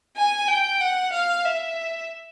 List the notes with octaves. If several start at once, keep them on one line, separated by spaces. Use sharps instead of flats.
G#5
G5
F#5
F5
E5